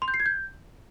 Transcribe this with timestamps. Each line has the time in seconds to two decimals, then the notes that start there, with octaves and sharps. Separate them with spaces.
0.02 C6
0.08 G6
0.14 C7
0.20 G#6
0.26 G6